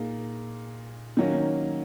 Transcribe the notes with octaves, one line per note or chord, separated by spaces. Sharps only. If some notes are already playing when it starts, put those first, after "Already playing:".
Already playing: A#2 A#3 D#4 G#4
D#3 F#3 A#3 C#4